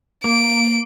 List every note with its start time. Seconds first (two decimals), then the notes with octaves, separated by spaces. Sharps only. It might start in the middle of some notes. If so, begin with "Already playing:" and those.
0.24 A#3 D7